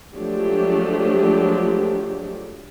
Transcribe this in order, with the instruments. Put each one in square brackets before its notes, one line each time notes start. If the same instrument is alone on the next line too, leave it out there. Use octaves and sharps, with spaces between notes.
[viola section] F3 F#3 G#3 A3 D4 G4